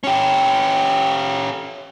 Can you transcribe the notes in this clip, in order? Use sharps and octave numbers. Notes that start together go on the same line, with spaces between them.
C#4 G4